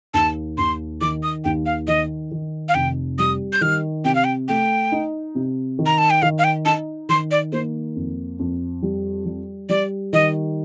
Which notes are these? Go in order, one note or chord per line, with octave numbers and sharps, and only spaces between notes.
D#2 A5
D#2 C6
D#3 D6
D#6
D#2 G5
F5
D#3 D#5
D#3
F5
F1 G5
G3 D#6
G6
D#3 F6
C3 G5
F5
G5
A3 G5
D#4
C3
D#3
A#5
A5
G5
D#3 F5
F5
G5
D#4 A5
D#3 C6
D5
A#3 C5
F2
F2
G3
G3
G3 D5
D#3 D#5